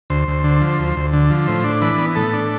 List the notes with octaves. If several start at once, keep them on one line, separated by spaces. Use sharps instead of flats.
D2 C5
D2
D3
F3
D2
D2
D3
F3
A2 C5
D4
E3 B4
B3
A2 A4
D4